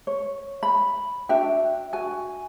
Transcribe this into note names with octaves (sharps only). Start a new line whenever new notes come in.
C#5
B5
D4 F#4 E5 G5
F#4 G#5